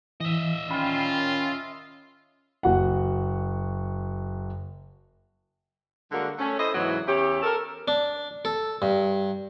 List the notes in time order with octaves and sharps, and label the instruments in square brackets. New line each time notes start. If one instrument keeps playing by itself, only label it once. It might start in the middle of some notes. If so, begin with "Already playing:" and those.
[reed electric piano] E3 [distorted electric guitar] D#5 E5
[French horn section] D#3 C#4 [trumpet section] F4 [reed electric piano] G5 B5
[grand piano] F#1 F#4 F#5
[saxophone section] D3 G3 G#3 A#3 F#4 A#4
A3 C#4
E4 A4 C5 D#5
G#2 C#3 E3 F#3 B3 E4
E2 C#4 E4 G4
A4 A#4
[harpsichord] D4
A4
G2